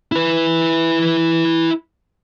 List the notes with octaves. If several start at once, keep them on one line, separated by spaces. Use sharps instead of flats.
E4 B4